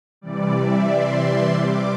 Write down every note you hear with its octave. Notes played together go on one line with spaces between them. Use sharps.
C3 E3 G3 D5
E5
C6
C3 G3 D6